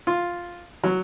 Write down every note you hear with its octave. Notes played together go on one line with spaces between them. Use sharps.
F4
F#3